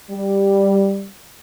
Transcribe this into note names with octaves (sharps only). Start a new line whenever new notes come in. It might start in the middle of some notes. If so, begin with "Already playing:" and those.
G3